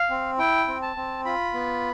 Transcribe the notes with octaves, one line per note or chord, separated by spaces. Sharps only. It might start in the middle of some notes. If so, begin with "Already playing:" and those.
Already playing: F5
C4
E4 G5
C4
A5
C4
F4 B5
B3